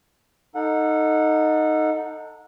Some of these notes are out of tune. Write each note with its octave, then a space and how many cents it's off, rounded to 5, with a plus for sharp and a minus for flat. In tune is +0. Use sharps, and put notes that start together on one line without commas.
D#4 +0 A4 +25 F#5 -25